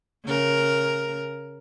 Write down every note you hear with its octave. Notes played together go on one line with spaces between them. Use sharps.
C#3 A#4